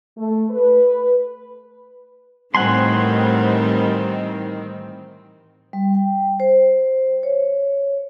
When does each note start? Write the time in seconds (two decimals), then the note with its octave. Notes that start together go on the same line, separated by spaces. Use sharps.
0.17 A3
0.50 B4
2.55 A2 D#3 E3 G3 C4 F#5 G#5 C6
5.73 G3
5.95 G5
6.40 C5
7.23 C#5